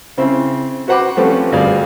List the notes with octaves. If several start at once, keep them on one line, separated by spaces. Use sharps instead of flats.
C#3 C4 E4
F#4 B4 C5 F#5 B5 D6
F3 A3 C4 C#4 G4 B4
D2 G2 G#4 D5 F5